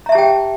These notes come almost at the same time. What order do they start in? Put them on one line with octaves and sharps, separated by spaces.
A#5 E5 A5 G4 G5